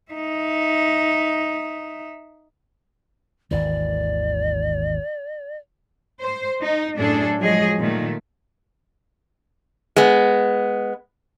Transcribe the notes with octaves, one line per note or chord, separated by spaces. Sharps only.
D#4 E5
G#1 D#2 E3 D5
C5
D#4
F#2 A2 D4 G#4 A4
F3 F#3 G#3 G#4 D#5
A#2 D#3 A3
G#3 B3